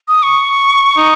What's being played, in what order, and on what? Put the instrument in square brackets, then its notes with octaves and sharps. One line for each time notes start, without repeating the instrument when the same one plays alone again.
[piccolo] D#6
C#6
[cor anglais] D#4